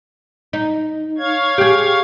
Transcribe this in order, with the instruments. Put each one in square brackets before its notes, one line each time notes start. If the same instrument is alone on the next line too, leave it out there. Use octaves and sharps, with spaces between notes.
[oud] D#4
[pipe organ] C#5 F5 G#6
[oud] G4 G#4